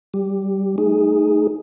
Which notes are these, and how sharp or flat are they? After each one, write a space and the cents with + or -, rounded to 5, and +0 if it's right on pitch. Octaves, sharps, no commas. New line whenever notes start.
G3 -20 G4 +5
A3 -5 D#4 +0 G#4 +0